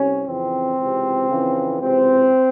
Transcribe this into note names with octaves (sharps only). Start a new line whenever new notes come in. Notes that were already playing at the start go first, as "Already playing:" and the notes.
Already playing: C2 C3 C#4
F2 C#3 E3 C4
C#2 C3 E3
F2 C#3 E3
C#2 C3 E3 C4